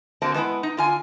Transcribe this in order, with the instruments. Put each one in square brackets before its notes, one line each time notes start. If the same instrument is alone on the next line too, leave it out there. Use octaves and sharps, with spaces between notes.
[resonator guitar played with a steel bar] D3 A#3 C4 F#4 A5
G#3 B3 C#4 E4
D#4
D3 F4 G#5